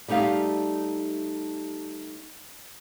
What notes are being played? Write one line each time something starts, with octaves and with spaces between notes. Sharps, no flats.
G3 A3 D#4 G4 F5